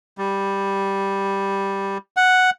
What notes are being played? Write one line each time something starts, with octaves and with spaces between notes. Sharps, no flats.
G3
F#5